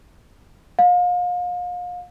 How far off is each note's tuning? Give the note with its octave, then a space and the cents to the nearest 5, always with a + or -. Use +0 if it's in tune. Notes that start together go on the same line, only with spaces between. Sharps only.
F5 +35